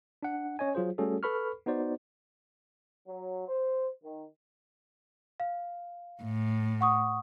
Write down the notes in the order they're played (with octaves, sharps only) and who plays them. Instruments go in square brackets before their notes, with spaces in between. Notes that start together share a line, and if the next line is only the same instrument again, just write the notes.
[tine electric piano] D4 F#5
C#4 C#5 D#5 G#5
F#3 F4 G#4 C5
G3 A3 C#4 F#4 G#4 A4
A4 B4 B5 C#6 F6
B3 D#4 F#4 C5 D5
[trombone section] F#3
C5
D#3
[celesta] F5
[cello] A2
[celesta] F#5 C#6 D#6